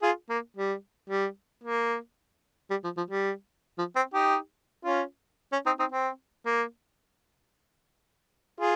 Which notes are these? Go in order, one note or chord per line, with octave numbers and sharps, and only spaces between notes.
F4 G#4
A#3
G3
G3
A#3
G3
F3
F3
G3
F3
C4
D#4 G4
C#4 F4
C#4
C4 D#4
C4 D#4
C4
A#3
F4 G#4